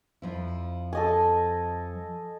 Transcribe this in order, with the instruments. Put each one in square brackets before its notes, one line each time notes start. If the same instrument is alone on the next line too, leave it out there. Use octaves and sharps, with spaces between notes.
[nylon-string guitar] F2 F3 E4
[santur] A4 D#5 G#5